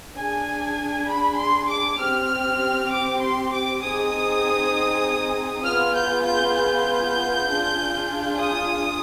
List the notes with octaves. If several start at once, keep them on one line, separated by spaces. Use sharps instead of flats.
D4 G#4 G#5
B5
C6
D6
C4 G4 F6
D6
C6
D6
C4 D#4 G#4 D#6
B3 F4 G#4 F6
G6
G6
G6
D4 F4 G#4
D#6